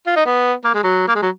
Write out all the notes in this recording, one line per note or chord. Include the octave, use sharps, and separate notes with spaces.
F4
D#4
B3
A#3
G#3
F#3
A#3
G#3
F#3